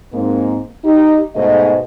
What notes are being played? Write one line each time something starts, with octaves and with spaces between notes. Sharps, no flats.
G#2 A#3 C4
D#4 G4
G#2 B2 A3 C5 D#5